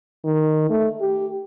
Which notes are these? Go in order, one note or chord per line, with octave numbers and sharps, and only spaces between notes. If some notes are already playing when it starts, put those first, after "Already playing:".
D#3
A3
G4